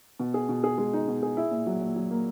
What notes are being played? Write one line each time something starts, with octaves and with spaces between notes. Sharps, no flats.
B2
G#4
B2
G#4
G#3
D#4
B2
G#4
E4
A#2
F#3
A#2
F#3
A#3